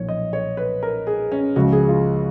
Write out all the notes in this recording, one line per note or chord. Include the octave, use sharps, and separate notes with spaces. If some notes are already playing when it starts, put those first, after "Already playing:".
Already playing: B1 A#2 F3 C#5
D#5
C#5
B4
A#4
G#4
C#4
C#2 C#3 F3 F#4
G#4
F4